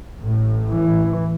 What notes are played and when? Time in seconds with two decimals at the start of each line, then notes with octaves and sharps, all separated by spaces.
0.20 A1 A2
0.70 E3